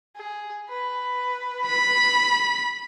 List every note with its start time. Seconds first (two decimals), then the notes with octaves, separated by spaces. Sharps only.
0.16 G#4
0.69 B4
1.68 B5